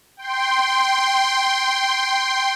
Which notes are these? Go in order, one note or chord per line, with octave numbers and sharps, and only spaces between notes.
G5 C6